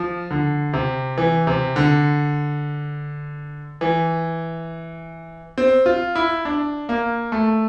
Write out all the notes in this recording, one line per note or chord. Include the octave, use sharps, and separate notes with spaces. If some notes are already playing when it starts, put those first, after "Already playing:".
Already playing: F3
D3
C3
E3
C3
D3
E3
C4
F4
E4
D4
A#3
A3